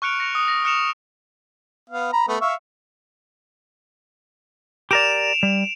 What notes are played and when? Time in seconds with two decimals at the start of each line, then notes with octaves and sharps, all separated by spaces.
0.02 C#6 F6 F#6 C#7 D7 F7
0.20 A#6 C#7 F7
0.35 D#6
0.48 A#6
0.64 D#6 F6 F#6 C#7 E7 F7
1.90 B3 F5
2.13 A#5 B5
2.28 A3 B3
2.41 E5 F5 C#6
4.91 G4 A#4 D5 D7 E7 F7
5.43 G3